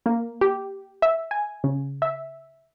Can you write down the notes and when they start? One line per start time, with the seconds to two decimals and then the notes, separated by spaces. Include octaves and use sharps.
0.06 A#3
0.41 G4
1.02 E5
1.31 G#5
1.64 C#3
2.02 E5